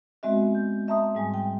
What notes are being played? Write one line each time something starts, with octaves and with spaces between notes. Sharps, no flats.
G#3 B3 C4 F#4 D#5 E5
G6
D#5 E5 A5 A#5 C6 D#6
G#2 G3 G#5
G5